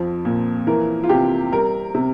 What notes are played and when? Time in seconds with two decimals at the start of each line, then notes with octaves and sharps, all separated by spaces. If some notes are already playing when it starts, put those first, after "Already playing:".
Already playing: F2 F3
0.25 A#2
0.67 E3 A#4
1.04 F4
1.09 C3 G4
1.52 G3 A#4
1.95 C3